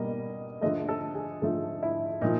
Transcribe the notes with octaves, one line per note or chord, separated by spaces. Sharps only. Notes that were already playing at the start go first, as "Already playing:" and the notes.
Already playing: B2 G3 A#3 D#5
D3 F3 A3 D#5
A4
G#4
D3 F3 A3
E4
A#2 F3 D#4